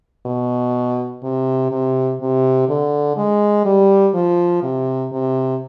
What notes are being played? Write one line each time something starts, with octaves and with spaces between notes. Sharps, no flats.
B2
C3
C3
C3
D3
G#3
G3
F3
C3
C3